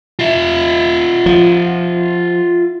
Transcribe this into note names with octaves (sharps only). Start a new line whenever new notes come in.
F4 E5
F3